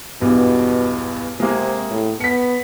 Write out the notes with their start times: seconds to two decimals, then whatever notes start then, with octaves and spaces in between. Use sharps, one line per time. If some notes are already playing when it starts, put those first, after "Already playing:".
0.21 B1 E2 G2 B2
1.40 C3 G#3 A#3 G#4
1.91 A2
2.21 B3 B6 C#7